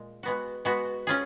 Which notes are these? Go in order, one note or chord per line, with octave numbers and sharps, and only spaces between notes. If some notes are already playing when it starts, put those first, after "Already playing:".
Already playing: A#2 G#3
G#3 B3 F#4
G#3 B3 F#4
C#4 F4 G#4